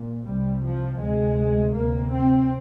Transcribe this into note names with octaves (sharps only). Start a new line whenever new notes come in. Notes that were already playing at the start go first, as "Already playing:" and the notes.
Already playing: A#2
C2 C3 G3
F3
D2 C3 G#3
D2 C3 A#3
C4